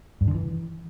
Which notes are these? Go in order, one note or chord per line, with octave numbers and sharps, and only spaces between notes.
G2
D3
E3